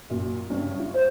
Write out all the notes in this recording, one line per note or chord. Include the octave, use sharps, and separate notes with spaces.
F#2 A#2
F#1 G2 C#4
F4
C5 C#5